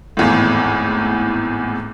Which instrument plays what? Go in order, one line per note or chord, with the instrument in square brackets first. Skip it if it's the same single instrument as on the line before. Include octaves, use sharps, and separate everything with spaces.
[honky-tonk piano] G#1 E2 A2